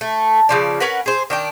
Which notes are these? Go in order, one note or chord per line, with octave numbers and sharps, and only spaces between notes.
A3
C#3 F3 D5
C#4 A#4 B4 F#5
G#4 C5
D#3 D4 G5